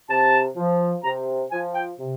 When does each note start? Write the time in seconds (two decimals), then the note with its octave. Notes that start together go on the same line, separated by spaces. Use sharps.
0.10 C3 A5
0.56 F3
1.04 C3 A#5
1.52 F3 G#5
1.74 G5
1.99 C3